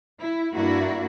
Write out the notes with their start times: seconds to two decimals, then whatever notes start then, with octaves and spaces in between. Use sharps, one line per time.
0.19 E4
0.53 G2 A#3 D4 E4 F#4